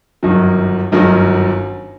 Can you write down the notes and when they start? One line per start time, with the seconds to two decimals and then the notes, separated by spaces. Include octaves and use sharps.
0.23 G1 F#2 D#3 F#3
0.92 G1 F#2 D#3 F#3